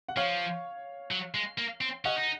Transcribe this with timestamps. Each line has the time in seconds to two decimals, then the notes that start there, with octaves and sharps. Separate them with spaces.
0.08 F#5
0.17 F3 C#5 F5
1.11 F#3
1.34 G#3
1.58 A#3
1.81 C4
2.05 C#4 D#5 F#5
2.18 D#4